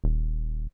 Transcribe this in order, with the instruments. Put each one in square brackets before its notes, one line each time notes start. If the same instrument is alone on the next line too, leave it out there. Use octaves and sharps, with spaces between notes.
[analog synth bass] D#1